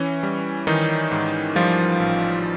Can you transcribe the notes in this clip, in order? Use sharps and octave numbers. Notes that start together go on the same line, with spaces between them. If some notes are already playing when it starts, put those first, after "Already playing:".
Already playing: E3 C#4
G3
D#3 E3 D#4
G#2
F3 G3 F4
A1